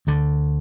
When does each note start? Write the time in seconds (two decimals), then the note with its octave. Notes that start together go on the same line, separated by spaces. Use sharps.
0.07 D2 D3